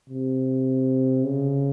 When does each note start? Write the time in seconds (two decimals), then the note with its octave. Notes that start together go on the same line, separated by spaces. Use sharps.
0.10 C3
1.23 C#3